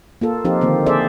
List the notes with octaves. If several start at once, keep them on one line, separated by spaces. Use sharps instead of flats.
A#3 F4 A4
F3 C4 D#4 F4 G4
D3 D#3 A#3 C4
C4 G#4 A4 C5 D5 E5